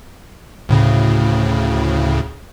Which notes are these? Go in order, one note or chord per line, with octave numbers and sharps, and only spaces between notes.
D2 A2 C#3